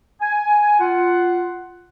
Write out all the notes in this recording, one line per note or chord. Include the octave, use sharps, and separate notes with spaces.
G#5
F4 F#5